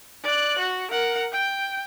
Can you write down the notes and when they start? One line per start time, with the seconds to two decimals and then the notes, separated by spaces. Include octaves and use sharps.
0.24 D5 F#6
0.59 F#4
0.91 A#4 F#5
1.32 G5